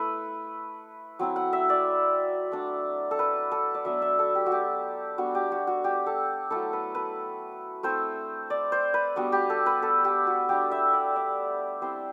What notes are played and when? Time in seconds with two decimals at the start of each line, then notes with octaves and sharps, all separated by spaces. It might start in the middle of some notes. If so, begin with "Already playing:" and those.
Already playing: A3 E4 B4
1.19 F#3 C4 E4
1.36 F#5
1.53 E5
1.69 D5
2.52 A3 D4
3.11 A4
3.19 B4
3.52 A4
3.75 D5
3.85 F#3 B3 D4 E5
4.02 E5
4.19 A4
4.35 G4
4.46 F#4
4.52 G4
5.18 G3 B3 D4 F#4
5.35 G4
5.52 F#4
5.67 F#4
5.84 G4
6.06 A4
6.51 F#3 A3 E4 A4
6.73 B4
6.95 B4
7.83 A3 C4 E4 C5
8.50 D5
8.72 C5
8.94 B4
9.16 G3 B3 D4 F#4
9.32 G4
9.50 A4
9.66 B4
9.82 A4
10.04 G4
10.27 F#4
10.49 G3 D4 G4
10.71 E5
10.93 D5
11.16 D5
11.82 G3 C4 E4 C5